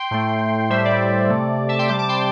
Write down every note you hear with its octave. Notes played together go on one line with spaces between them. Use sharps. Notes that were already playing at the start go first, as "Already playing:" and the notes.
Already playing: G5 C6
A2 A3
A2 G3 C5 E5
D5
C3 A3
E5 A5
G5 C6
C3 G3 A5 D6
A5 D6
G5 C6